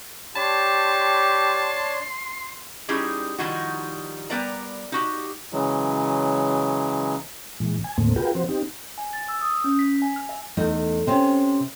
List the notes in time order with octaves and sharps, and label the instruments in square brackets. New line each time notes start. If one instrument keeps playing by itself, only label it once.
[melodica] D4 C#5 [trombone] G4 [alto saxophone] A5 [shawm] C6
[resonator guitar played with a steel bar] G3 C#4 D#4 E4 G4 G#4
D#3 F3 G3 D#4 E4 F#4
G3 B3 A#4 D5 A#5
D#4 F#4 G4
[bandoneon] C#3 E3 F#3 G#3
[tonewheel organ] A#2 E3 G#3
G#5
D#2 A2 D3 A3 A#3 C4
F4 F#4 G#4 A#4 B4 G5
F3 C4 F#4 C5
C4 D#4 G4
[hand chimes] G#5
A6
E6
D#6
C#4
B6
G#5
F6
E5
[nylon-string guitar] E2 A3 D#4
C3 C4 C#4